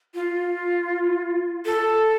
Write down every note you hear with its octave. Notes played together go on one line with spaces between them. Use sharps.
F4
A4